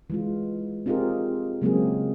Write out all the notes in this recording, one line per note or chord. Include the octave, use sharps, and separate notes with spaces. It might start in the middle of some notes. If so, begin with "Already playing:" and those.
E3 G#3 F4
C4 D#4 F4 G4 G#4 A#4
C#3 F#3 G#3 A#3 C4 G#4